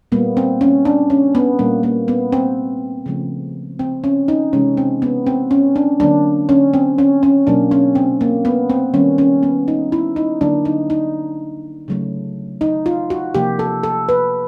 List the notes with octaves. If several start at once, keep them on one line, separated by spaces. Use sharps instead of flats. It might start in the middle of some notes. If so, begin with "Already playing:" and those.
A#2 G3 A#3 B3
C4
C#4
D4
C#4
B3
A#2 G3 A#3
A#3
B3
C4
C#3 F3 A3
C4
C#4
D#4
C3 E3 G#3 C#4
C4
B3
C4
C#4
D4
D3 F#3 A#3 D4
C#4
C4
C#4
C#4
B2 F#3 A#3 D4
C#4
C4
A#3
B3
C4
D#3 G3 A#3 C#4
C#4
B3
D#4
E4
D#4
D3 F#3 A#3 D4
D#4
D#4
C#3 F#3 A3
D#4
F4
F#4
C3 F3 A#3 G4
A4
A4
B4